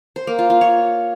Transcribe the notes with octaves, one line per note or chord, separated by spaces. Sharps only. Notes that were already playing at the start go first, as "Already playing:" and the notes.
C5
A#3
F4
F4
C#5